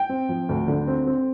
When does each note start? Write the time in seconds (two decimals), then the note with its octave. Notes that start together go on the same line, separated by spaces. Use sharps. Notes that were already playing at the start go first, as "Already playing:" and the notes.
Already playing: G5
0.09 C4
0.29 F3
0.49 D2
0.68 D3
0.87 C4
1.07 C4